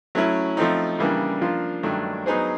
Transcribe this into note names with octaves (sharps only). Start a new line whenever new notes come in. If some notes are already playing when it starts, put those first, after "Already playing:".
F#3 A3 C#4 E4
F3 A3 C4 D#4
C#3 E3 G3 A#3 D4
F3 A#3 D4 F4
G2 D#3 F#3 A3 D4
F#3 B3 D#4 G#4 C5